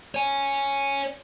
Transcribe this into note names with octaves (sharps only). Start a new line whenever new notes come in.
C#5 G#5